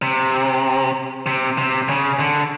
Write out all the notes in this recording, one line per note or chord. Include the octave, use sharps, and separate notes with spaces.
C3
C3
C3
C#3
D3